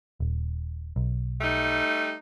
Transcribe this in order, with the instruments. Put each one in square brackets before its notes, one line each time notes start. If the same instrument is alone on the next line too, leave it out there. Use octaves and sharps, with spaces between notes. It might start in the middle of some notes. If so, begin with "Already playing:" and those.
[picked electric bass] D#1
B1
[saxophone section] G3 A3 D#4